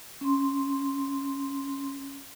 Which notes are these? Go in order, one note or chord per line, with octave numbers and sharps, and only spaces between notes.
C#4 C6